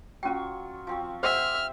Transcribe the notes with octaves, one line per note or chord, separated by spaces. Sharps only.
F#3 C#4 F4 G5 C#6
F3 C4 C#6
G4 C5 E5 F#5 C6 D#6 F6